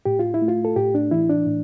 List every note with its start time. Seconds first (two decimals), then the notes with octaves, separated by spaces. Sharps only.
0.05 A2 G4
0.19 F4
0.34 E4
0.42 A3
0.48 F4
0.65 A4
0.76 A2 G4
0.95 D4
1.11 E3 E4
1.30 D4
1.46 A2